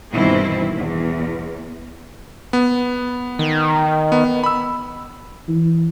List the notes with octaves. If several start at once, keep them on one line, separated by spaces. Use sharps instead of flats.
G2 B2 D#3 E3 C4 E4
E2
B3
D#3
B3
B5 E6
E3